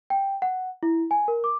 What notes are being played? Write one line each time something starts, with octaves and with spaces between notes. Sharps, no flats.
G5
F#5
E4
G#5
A#4
D6